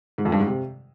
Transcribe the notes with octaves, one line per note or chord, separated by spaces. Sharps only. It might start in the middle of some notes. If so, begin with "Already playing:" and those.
G#2
F2
G2
G#2
C3